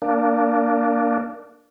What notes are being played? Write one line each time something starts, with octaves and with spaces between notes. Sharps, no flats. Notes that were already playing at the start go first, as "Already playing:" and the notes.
A#3 D4